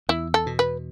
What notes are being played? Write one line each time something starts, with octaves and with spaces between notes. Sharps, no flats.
E2 E4
A4
B2
B4